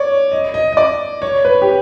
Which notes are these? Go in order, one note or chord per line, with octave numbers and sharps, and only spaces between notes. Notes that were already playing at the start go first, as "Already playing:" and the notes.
Already playing: C#5 D5
D#5
D#5
D#5
D5
C#5
B4
G4